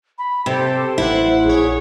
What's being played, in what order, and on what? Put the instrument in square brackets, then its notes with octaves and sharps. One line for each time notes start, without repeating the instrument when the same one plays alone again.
[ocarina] B5
[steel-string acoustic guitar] C3 [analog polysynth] G4 A4 [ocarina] C5
[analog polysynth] A1 F#5 [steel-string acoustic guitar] E4
[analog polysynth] A#1 C#5 [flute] G#4